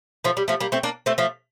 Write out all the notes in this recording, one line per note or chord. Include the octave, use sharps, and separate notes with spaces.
F3 A3
G3
F3 A3
G3 A#3
A3 C4
A#3 D4
A3 C4
F3 A3